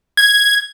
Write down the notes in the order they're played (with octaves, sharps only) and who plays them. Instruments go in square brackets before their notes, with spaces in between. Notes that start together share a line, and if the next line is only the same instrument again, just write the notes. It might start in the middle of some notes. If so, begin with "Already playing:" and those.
[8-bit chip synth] G#6